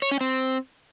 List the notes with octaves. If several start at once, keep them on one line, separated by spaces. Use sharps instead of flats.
C#5
C#4
C4